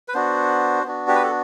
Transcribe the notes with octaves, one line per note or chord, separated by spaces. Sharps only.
B4
B3 D4 F#4 C5
B3 D4 F#4
G4
B4
A4